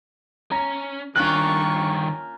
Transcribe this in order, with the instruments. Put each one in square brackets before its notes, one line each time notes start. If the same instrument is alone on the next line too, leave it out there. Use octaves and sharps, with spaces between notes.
[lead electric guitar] C#4 [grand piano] A#5
[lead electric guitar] G2 D#3 [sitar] A#3 C#4 F4 [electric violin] D4 C#6 [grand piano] F#6